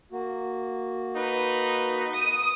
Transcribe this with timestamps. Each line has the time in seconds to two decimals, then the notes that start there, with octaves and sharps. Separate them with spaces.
0.12 A#3 F#4
1.16 D#4 B4
2.13 D#6 D#7